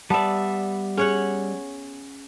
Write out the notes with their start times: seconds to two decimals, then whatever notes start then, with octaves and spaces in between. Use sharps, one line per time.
0.10 G3 B3 D5 E5 A5
0.97 C#4 G#4 C#5 F#5